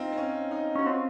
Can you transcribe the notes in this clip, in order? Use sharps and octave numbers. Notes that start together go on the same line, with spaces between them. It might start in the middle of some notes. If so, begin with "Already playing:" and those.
Already playing: C4 D#4 F4
C4
C#4
D#4
C#4 F#4
C4 F4